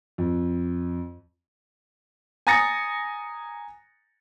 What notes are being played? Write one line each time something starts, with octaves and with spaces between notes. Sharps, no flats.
F2
G#5 A#5 D#6 A6 A#6 C#7